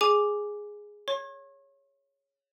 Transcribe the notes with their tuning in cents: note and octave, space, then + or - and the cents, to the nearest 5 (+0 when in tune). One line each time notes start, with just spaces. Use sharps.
G#4 +0 G#5 +0 D6 +0
C#5 +0 C#6 -45